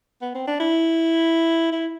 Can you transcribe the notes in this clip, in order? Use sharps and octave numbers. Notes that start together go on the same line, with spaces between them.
B3
C4
D4
E4
E4